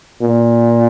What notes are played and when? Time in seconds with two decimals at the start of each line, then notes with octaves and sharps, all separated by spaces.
0.22 A#2